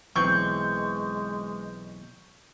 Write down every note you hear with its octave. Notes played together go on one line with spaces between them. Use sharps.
B1 E3 G#3 C4 C#6 G6